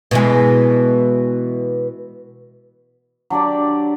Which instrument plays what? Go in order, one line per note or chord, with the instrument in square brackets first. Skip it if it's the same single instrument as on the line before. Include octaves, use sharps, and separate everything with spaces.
[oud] B2 E3 G#3
[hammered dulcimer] F#3 D4 G4 D5